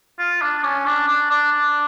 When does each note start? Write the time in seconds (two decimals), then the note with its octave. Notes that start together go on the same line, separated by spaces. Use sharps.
0.19 F4
0.41 D4
0.64 C#4
0.86 D4
1.07 D4
1.30 D4
1.52 D4